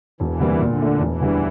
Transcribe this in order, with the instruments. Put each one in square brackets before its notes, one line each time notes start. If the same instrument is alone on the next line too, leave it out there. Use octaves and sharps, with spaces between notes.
[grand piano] E1 [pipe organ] E3
[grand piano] D2 C3 G3 A#3
[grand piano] A#2 [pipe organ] D3
[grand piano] A3 D4
[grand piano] E1 [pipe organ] E3
[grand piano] D2 D3 G3